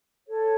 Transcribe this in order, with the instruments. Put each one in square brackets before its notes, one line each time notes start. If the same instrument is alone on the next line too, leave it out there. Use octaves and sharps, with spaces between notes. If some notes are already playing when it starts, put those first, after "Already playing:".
[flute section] A4 C#5